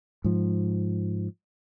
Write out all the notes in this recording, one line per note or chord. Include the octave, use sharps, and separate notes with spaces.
G#2 F3